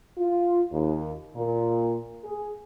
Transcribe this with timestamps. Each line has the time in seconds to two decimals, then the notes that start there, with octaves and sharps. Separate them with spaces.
0.18 F4
0.72 D#2
1.36 A#2
2.24 G#4